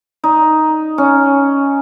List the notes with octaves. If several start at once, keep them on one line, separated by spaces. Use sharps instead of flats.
D#4
C#4